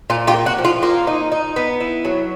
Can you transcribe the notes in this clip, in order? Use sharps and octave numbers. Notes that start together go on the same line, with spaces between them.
A#2 F4
F4 G4
A#3
F#4
F3
F4
A#3 F4
D#4
D#4
B3
E4
F#3